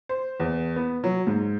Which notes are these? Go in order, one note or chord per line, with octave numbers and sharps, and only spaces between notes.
C5
E2
B3
F#3
G#2